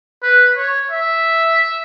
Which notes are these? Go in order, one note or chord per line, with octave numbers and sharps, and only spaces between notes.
B4
C#5
E5